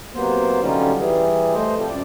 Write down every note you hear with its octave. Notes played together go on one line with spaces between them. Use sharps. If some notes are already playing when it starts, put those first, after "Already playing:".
C3 F#3 A#3 B3 C5
D3 F#3 G3 C#4 D#4 F4
E3 G3 G#4
A3 C5 D#5
C3 F3 G3
F#2 D5